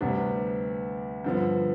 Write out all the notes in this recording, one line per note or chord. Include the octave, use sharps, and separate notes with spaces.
D2 C3 G3 B3 D4
G2 D3 F3 B3